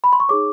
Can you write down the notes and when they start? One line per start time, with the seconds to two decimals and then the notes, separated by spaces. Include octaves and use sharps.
0.04 B5
0.13 C6
0.20 C#6
0.29 D#4 G#4 C#5 D6